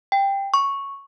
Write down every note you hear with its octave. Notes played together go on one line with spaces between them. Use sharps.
G5
C#6